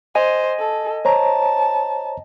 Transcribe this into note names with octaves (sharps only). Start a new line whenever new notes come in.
C5 D#5 G#5
A4
C5 C#5 A5 A#5